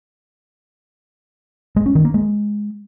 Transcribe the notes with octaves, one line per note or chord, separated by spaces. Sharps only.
G#3
C#4
D#3
A#3
G#3